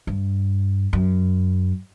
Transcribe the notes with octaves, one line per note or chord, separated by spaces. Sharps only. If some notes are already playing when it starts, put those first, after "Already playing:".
G2
F#2